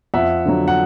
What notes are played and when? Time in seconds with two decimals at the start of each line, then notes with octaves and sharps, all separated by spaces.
0.14 F2 E5 F#5
0.45 D3 F#3
0.68 F#5